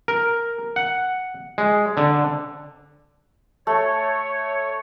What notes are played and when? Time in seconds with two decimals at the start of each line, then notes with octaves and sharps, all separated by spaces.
0.08 A#4
0.76 F#5
1.58 G#3
1.97 D3
3.67 A3 C#5